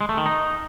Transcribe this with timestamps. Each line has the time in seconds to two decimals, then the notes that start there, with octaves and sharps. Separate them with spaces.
0.01 G#3
0.09 A3
0.17 D#3
0.26 D#4